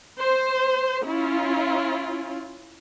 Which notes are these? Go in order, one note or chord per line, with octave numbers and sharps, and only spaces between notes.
C5
C#4 E4 F4